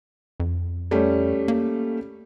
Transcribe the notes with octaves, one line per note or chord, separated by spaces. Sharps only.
F2
G3 A3 C#4
A#3